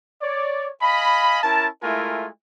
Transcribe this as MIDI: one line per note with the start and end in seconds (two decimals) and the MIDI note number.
0.22 0.69 73
0.22 0.69 74
0.82 1.42 75
0.82 1.42 77
0.82 1.42 80
0.82 1.42 83
1.43 1.67 61
1.43 1.67 64
1.43 1.67 70
1.43 1.67 81
1.83 2.28 56
1.83 2.28 57
1.83 2.28 64
1.83 2.28 65
1.83 2.28 70
1.83 2.28 80